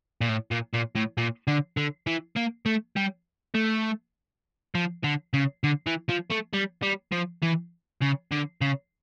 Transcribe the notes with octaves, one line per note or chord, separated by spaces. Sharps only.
A#2
A2
A#2
A#2
A2
A#2
D3
D3
E3
A#3
A3
G3
A3
F3
D3
C#3
D3
E3
F3
A3
G3
G3
F3
E3
C#3
D3
C#3